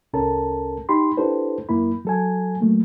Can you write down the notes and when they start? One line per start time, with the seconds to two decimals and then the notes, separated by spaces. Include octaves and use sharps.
0.13 C2 C#4 A4 A#4 A5
0.89 D#4 G4 B5 C6
1.17 D4 E4 G4 A4 B4 C5
1.69 F#2 A#3 E4 B5
2.05 F#3 A4 G#5
2.61 F#3 A3 A#3